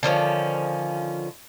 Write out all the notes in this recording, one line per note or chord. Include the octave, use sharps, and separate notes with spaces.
D3 D#3 F3 C#4